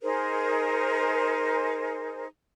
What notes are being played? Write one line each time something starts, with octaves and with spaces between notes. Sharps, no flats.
D#4 G#4 A#4 C5